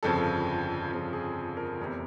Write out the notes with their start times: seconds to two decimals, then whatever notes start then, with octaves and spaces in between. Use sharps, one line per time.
0.03 G1 F2 C#3 F3 A4
0.92 G1 F2 C#3 F3
1.13 G#4
1.57 A#4
1.79 F1 E2 C3